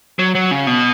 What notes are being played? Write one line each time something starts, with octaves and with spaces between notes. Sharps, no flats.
F#3
F#3
C#3
B2